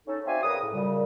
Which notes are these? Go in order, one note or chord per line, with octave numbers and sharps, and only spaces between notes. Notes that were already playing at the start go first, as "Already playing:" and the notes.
C#4 D#4 A4
C4 F#4 D5 E5 F5 G#5
C#3 A#3 A#4 B4 D#6
A2
F#2 A#2 C#3 G3